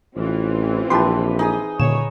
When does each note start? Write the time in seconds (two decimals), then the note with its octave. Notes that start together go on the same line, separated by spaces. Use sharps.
0.16 A1 E3 C4 F4
0.90 A#1 G4 B4 E5 A5 C6
1.39 D#4 G#4 D#6
1.80 D#1 A#2 D3 C#5 E7